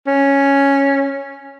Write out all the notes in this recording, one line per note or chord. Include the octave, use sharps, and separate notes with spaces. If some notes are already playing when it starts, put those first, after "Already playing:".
C#4